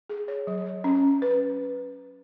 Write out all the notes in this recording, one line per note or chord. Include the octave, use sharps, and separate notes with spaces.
G#4
C#5
F#3
C#5
C#4
C#4
B4